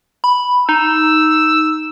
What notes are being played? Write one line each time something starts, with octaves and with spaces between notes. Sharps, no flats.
B5
D#4 E6